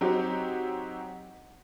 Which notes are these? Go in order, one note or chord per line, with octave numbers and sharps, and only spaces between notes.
F#3 C4 D#4 F#4 G4